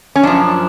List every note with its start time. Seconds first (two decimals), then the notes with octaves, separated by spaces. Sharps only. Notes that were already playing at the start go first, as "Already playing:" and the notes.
0.16 C#4
0.23 F#2 F3 D4